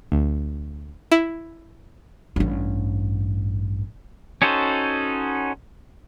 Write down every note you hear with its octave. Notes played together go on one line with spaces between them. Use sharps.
D2
E4
A1 G2
C#4 D#4 F#4 A4 C5